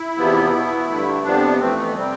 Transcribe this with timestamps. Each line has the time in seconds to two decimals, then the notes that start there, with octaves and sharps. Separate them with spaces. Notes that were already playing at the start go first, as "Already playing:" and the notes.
Already playing: E4
0.17 E2 C3 F3 B3
0.53 B2 B3
0.88 G2 D3 A3
1.23 F2 C3 F3 B3 D4
1.59 F2 E3 A3 C4
1.76 B3
1.95 C3 G3 C4